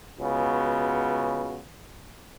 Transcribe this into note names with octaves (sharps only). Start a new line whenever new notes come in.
C#2 C#3 B3 F#4